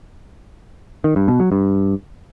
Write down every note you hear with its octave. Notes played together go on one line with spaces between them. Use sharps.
D#3
G2
B2
F#3
G2